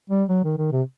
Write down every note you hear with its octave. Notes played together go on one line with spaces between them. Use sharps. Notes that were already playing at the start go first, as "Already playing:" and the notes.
G3
F#3
D#3
D#3
C3